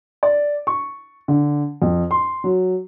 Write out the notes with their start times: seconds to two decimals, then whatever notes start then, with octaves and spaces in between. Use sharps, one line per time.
0.23 D5
0.67 C#6
1.28 D3
1.82 F2
2.11 C6
2.44 F#3